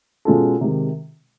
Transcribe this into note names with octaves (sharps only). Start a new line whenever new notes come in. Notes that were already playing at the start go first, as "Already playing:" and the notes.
B2 G#3 C#4 F4 A4
C3 D#3 G#3